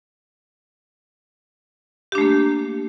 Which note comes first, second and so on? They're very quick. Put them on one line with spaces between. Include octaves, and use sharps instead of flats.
G4 D4 A3 A#3